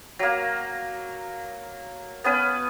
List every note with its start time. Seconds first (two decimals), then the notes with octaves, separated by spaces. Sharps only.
0.19 F#3 A#3
2.24 B3 C#4 B4